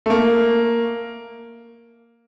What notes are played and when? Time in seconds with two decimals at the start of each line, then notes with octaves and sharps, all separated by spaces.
0.06 A3
0.10 A#3